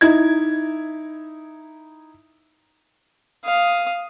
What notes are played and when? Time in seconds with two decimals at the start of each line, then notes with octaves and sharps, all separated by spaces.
0.01 D#4 E4 G#6
3.45 F5 D#6